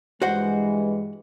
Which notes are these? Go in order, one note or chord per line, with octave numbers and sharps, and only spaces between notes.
G2 E3 G#3 F#4 C5 F#5